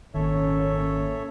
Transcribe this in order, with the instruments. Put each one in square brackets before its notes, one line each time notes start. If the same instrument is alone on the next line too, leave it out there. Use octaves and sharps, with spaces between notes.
[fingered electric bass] G#1 D#3 [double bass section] A#2 A#3 C#4 [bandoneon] A4 C#5 E5